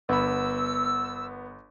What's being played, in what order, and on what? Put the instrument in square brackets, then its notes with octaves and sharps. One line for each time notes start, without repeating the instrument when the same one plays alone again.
[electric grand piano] G1 B5 [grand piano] B3 [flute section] E6